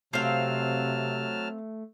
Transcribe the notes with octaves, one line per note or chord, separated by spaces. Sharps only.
C3 F#3 A3 C4 F5 A5 F6